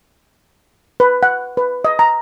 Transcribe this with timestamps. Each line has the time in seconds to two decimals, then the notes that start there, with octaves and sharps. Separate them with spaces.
1.00 B4
1.23 F#5
1.57 B4
1.85 D#5
1.99 A#5